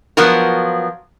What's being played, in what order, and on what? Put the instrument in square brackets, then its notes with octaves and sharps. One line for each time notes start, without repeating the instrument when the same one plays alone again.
[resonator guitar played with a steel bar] F3 F#3 B3 F4 F#4 A#4